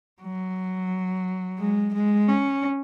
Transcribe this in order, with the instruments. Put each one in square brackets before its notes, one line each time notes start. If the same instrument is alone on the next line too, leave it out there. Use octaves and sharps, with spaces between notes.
[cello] F#3
G#3
G#3
C#4